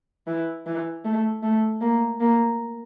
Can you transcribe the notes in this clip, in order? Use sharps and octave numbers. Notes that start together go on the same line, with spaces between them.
E3
E3
A3
A3
A#3
A#3